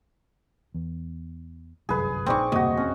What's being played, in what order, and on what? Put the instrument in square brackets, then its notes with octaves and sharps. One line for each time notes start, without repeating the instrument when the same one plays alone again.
[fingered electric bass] E2
[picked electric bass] G1 [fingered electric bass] C2 F#2 [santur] G#4 B4
[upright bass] A#1 D#4 [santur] C4 D5 C#6
[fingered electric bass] E1 [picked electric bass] D2 G2 C3 [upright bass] A#3 [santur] F#4 D#5
[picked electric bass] G#1 F2 C4 [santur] C#4